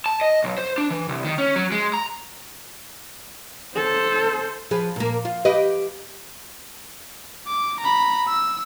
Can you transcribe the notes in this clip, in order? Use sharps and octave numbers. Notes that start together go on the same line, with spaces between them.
A5
D#5
B1
C5
D4
E3
C2
D#3
C#4
F#3
G#3
A#5
A4 C5
F3 G#4 B4
A#2 A#3
F4
G4 B4 D#5
D6
A#5 B5
E6